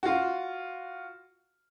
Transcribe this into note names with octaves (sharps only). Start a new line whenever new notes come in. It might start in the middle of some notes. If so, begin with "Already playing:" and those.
F4 F#4